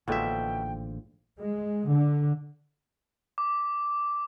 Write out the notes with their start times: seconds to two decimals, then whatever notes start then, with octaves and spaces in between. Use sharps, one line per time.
0.08 A1 G#2 B2 D3 F3 A#3 E5 G5
1.39 G#3
1.90 D3
3.38 D6